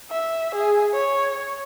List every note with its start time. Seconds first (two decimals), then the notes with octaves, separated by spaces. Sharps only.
0.11 E5
0.55 G#4
0.93 C#5